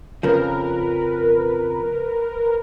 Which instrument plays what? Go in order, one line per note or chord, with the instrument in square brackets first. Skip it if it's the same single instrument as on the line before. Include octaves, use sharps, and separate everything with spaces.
[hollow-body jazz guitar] F2 C#3 F3 [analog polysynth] A#4 B4